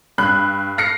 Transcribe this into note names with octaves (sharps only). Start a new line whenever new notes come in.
G2 B5 F#6
F6 A#6 C7 C#7